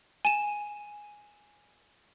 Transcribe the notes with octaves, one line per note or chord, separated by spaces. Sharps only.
G#5 E7